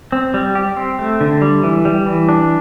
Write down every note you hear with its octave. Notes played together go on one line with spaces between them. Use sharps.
C4
G3
G4
C4
A3
D3
G3
E3
G3
E3
D4